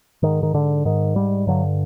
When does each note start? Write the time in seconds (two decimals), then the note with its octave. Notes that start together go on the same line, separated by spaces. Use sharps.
0.23 G#2 D#3
0.43 D#3
0.54 D3
0.85 G#2 D#3
1.16 G3
1.47 G2 D3 F#3